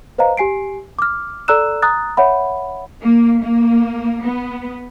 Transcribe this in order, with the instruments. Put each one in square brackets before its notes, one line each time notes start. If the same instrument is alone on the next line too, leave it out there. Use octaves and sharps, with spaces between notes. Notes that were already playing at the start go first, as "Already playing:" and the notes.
[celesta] B4 C5 D#5 F5 A#5
G4 G#5 C7 D7
D6 F6
A4 D5 A#5 E6 F#6 E7
A#5 D#6 F#6 A6
C#5 E5 F#5 B5
[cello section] A#3
A#3
B3